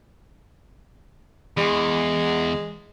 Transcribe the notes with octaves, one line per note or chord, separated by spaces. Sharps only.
E2 G#3